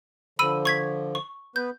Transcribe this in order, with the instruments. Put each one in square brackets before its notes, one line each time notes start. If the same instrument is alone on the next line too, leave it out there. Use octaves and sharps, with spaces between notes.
[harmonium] D3 F3 [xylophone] B5 E6 D#7
[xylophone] C#6 G#6 B6
C#6
[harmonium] B3 B4 [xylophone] G6